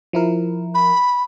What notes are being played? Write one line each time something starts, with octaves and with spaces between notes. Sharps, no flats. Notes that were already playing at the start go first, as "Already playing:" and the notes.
F3 E4 A#4
B5